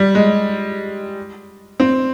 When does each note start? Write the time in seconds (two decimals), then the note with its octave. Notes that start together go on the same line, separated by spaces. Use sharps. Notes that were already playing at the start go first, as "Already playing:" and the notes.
Already playing: G3
0.15 G#3
1.80 C4